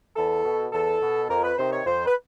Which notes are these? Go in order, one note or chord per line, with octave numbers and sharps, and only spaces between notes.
E2 A4
B2
E2 A4
B2
F2 A#4
B4
C3 D#3 C5
C#5
F2 C5
B4